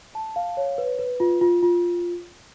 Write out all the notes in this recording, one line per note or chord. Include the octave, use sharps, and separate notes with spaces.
A5
F5
C#5
B4
B4
F4
F4
F4